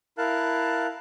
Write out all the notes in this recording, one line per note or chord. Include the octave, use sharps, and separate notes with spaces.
E4 A#4 F5 A5 F#6